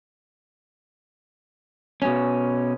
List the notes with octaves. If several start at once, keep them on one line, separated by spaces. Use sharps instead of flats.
B2 C#4